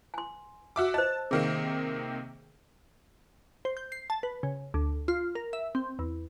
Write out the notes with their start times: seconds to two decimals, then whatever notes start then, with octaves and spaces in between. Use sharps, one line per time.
0.14 G#5 C6
0.76 F#4 E5 D6
0.94 C5 D#5 A5
1.31 C3 D#3 A#3 G#4
3.65 C5
3.77 G6
3.92 C7
4.10 A5
4.23 B4
4.43 C#3
4.74 D2
5.08 F4
5.35 A#4
5.53 E5
5.75 C4
5.99 E2